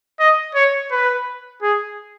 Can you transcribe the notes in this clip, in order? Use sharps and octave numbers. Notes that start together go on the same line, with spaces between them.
D#5
C#5
B4
G#4